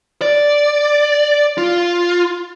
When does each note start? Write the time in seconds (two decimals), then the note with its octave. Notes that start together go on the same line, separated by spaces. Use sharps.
0.22 D5
1.58 F4